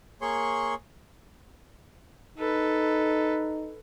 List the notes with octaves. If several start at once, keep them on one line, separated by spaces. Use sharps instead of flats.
A#3 G#4 C#5 C6 C#6
D#4 A4 B4